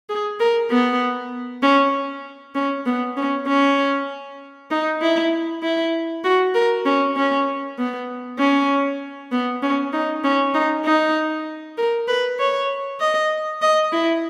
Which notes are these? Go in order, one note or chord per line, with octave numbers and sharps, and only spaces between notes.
G#4
A#4
B3
C#4
C#4
B3
C#4
C#4
D#4
E4
E4
F#4
A#4
C#4
C#4
B3
C#4
B3
C#4
D#4
C#4
D#4
D#4
A#4
B4
C#5
D#5
D#5
E4